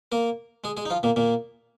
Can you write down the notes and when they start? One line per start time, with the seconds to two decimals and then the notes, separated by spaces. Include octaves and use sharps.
0.12 A#3 A#4
0.64 G#3 G#4
0.77 G#3 G#4
0.85 D#4
0.90 F3 F4
1.03 A#2 A#3
1.16 A#2 A#3